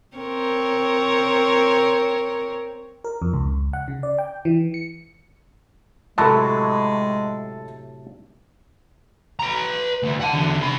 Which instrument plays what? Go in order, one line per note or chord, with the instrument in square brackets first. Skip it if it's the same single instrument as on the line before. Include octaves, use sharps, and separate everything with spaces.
[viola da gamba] C4 A#4 C#5
[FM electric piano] A#4
F2
C#2
F#5
C#3
D5
G5
E3
C#7
[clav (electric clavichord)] A2 C3 F#3 [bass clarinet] G#3 [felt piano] A4 A5
[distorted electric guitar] B4 A#5
D2
F#5 A5
E2 D3
C3 B5